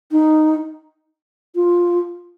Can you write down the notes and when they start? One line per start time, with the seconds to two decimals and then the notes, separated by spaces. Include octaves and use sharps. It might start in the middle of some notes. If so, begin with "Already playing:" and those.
0.12 D#4
1.55 F4